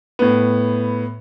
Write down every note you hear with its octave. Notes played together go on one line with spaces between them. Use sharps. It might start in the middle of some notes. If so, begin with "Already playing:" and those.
A2 B3